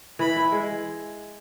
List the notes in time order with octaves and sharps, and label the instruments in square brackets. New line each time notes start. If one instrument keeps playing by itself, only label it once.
[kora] E3 [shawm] B5
[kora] E4
G#3